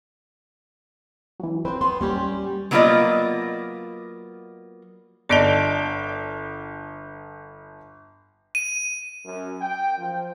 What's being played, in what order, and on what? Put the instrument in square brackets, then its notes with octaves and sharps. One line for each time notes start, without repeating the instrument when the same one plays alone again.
[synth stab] E3 F#3
[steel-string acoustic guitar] C4 [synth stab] B4 C5
[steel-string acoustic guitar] B3 [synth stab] C6
[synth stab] D#2 [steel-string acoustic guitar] G3 C#4 G4
[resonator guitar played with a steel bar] F#3 A#3 B3 F4 D5 D#5
[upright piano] G1 D7 G7 [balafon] D5 D#5 A5
[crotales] D#7
[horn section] F#2
G5
F3